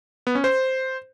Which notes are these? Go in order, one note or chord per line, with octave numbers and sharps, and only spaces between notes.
B3
C#4
C5